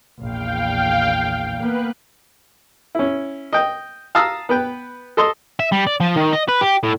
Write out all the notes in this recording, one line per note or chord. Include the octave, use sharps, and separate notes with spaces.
A#1 E2 F5 G5
A#3 B3 B4 F#6
C#4 E4
D#5 G5
F5 A5 A#5 D#6 E6
B3 B4 G5
A4 D#5 C6
E5
G3
D5
F3
D#3
D#5
B4
G4
A2